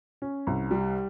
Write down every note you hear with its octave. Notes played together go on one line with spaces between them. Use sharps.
C#4
C2
G3